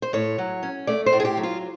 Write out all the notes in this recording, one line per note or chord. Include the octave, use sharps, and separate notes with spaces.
C5
A2 C#5
F#3
C#4
A3 D5
C5
A2
G#4
G4
F#3
F4